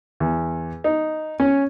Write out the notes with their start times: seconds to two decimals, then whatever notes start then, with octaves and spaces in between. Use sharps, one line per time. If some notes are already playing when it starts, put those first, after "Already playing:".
0.20 E2
0.84 D#4
1.40 C#4